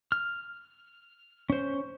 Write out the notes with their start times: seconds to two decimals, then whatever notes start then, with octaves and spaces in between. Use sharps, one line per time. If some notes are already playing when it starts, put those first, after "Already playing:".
0.12 F6
1.50 C#4 C5